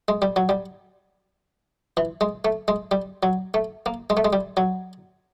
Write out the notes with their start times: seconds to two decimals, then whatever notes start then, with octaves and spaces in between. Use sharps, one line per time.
0.08 G#3
0.22 G3
0.36 F#3
0.49 G3
1.97 E3
2.21 G#3
2.45 A3
2.68 G#3
2.91 G3
3.23 F#3
3.54 A3
3.86 A#3
4.10 G#3
4.17 A3
4.25 G#3
4.33 G3
4.57 F#3